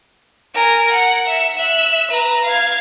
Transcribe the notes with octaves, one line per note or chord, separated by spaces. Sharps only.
A#4 G#5
F#5
E5
E5 F#6
B4 A#5
F5 G#6